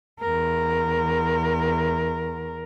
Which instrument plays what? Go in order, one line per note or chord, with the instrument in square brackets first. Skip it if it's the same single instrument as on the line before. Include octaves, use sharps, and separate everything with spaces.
[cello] E2 A#4